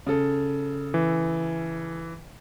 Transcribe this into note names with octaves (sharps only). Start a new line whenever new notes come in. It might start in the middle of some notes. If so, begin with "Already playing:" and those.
C#3 A4
E3